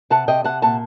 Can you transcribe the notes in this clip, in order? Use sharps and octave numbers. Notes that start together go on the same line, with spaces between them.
C3 F#5 A5
C3 D#5 G5
C3 F#5 A5
A#2 F#5 A5